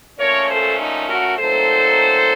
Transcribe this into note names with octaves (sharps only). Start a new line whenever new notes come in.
A#2 A3 C#4 A#4 C#5
A4 C5
D#4
F#4 A#4
A#2 F#3 A3 C4 D#4 A4 C5